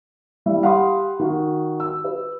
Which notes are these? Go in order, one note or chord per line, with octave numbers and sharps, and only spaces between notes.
E3 G3 E5
G4 F5 F#5 B5 C6 D#6
D#3 F#4
E6
B4